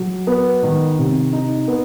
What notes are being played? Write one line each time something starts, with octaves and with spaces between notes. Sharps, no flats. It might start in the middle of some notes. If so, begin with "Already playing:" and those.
Already playing: F#3
B3
D#3
C3
D#4
B3